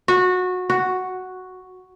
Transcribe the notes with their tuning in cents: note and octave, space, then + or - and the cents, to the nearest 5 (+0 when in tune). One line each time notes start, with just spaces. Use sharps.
F#4 -20
F#4 +0